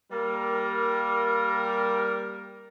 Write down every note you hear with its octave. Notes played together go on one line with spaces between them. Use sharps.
G3 A#3 A#4